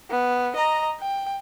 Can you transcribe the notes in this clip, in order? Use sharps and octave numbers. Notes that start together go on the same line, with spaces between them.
B3
D#5 A#5
G5